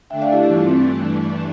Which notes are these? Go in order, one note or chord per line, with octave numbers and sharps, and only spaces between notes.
D3 A3 D4 E5 G5
D5 F5
E4 G4
G2 E3 A3 D4 E4 G4
F4
C4